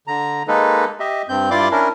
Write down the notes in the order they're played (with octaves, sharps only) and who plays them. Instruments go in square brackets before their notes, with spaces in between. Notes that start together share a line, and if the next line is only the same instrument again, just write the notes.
[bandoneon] D3 A#5
G#3 A#3 D#4 A4 B4
G4 D#5 E5
G2 C4 G6
G2 E4 F4 D5 C6 D6
C#4 D4 E4 A#4